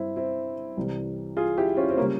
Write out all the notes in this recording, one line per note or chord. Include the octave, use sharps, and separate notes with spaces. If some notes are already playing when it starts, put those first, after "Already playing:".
Already playing: G2 G3 C4 E4
C4 E4
C2 C3 E3 G3
F4 G#4
E4 G4
C#4 F4
C4
A#3 C#4
C#3 G3